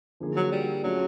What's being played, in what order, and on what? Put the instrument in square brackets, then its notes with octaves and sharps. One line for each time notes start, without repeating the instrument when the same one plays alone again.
[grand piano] D3 F3 A#3 D#4 G#4
[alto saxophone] F#3
G3
[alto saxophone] F#3 [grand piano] A3 C#4 F4 G#4